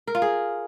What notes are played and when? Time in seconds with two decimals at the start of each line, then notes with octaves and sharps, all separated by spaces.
0.07 A#4
0.15 F4
0.22 G#4